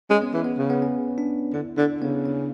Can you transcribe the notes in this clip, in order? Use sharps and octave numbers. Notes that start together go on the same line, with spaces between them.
G#3 C#4
B3
E3
B3
C#3
B3
C#4
D4
D3 E4
D3 D4
C#3 B3
C#4